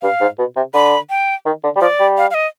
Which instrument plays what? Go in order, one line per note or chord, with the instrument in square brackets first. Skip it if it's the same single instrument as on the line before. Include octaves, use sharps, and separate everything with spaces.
[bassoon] G2 [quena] F5
[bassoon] G#2
B2
C3
[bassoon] D3 [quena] B5
[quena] G5
[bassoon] D#3
D3
G3
[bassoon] F3 [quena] D5
[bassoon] G3
[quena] F5
F5
D#5